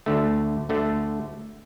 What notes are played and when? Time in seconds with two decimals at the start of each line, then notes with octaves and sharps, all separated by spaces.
0.06 D2 D3 A3
0.69 D2 D3 A3